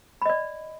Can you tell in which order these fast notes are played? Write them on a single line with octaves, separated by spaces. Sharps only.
B5 D#5 D5